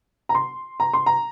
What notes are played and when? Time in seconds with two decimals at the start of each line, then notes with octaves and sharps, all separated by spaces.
0.29 A#5
0.35 C6
0.80 A#5
0.93 C6
1.06 A#5